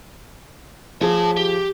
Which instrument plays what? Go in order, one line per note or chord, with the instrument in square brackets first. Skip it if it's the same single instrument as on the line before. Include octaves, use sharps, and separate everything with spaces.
[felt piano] F3 G#4 [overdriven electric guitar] C#5 A5
[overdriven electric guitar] G4